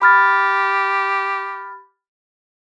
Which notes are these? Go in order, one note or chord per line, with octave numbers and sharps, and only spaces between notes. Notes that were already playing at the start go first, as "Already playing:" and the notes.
G4 B5 F6 A6